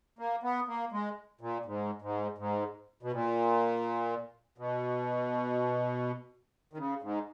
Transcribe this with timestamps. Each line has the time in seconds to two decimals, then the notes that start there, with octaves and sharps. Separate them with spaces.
0.19 A#3
0.43 B3
0.68 A#3
0.92 G#3
1.41 A#2
1.65 G#2
2.02 G#2
2.38 G#2
3.03 B2
3.12 A#2
4.58 B2
6.73 D#3
6.78 C#3
7.02 G#2